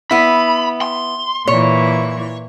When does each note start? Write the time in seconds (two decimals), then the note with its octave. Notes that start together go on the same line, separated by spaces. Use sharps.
0.11 B3 E4 B5
0.81 C6
1.48 A#2 E3 C#5